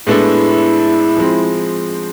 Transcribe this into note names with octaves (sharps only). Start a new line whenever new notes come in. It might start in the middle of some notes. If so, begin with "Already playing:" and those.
A2 G#3 B3 D4 E4 A4
F3 G#3 C4